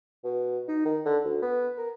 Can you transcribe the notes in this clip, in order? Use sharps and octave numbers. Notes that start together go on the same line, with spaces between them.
B2
D#4
D#3
D3
D2
B3
A#4